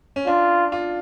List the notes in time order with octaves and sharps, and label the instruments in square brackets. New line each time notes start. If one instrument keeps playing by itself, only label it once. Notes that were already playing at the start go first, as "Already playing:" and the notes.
[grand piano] C#4
[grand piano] D4 [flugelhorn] F4
[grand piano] F4